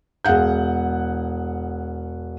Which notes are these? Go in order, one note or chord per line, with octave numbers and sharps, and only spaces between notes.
E1 G#4 F5 F#5 G6